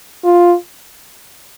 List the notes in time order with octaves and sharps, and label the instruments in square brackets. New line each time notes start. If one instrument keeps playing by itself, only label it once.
[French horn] F4